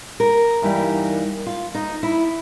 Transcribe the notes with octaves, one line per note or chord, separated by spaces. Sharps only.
A#4
G2 E3 G3 A#3 D#4
F4
D#4
E4